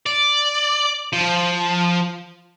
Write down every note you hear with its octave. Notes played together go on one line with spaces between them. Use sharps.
D5
F3